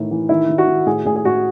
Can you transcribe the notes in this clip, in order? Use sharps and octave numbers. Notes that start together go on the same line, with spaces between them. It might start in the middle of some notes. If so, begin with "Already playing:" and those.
Already playing: A2 D#3 E3
E3
D#3 E4
D#3
F#4
D#3
A2 G#4
A2 G#4
G#4
A2 F#4